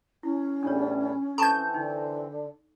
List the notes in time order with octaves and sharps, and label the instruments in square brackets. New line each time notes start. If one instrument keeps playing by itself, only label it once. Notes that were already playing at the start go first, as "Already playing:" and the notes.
[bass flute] C#4 [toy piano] E4
[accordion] E2 A2 G3 [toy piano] D4 C#5
[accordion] E3 C4 [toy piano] A4 A#5 C#6 [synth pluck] A5 G6
[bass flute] D3 [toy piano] D#4